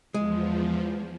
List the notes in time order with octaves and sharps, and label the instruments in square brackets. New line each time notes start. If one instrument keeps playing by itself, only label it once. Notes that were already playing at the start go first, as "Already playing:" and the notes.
[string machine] E2 F3 [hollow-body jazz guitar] G#3